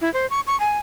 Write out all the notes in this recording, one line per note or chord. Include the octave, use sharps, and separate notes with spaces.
E4
C5
C#6
C#6
G#5